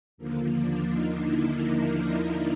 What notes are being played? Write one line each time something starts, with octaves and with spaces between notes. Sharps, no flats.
D#2 D3 F3 A#3
D4
D#4
E4
A#4
A#4